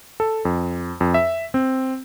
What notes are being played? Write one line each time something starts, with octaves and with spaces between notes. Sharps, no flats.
A4
F2
F2
E5
C4